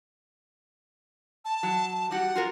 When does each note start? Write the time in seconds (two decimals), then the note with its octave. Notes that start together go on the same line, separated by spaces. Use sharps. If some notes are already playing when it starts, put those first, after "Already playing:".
1.45 A5
1.63 F#3
2.11 G3 F#4 F#5
2.35 F4 F#4 A#4